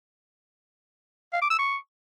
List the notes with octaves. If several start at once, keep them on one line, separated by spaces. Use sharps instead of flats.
F5
D6
E6
C#6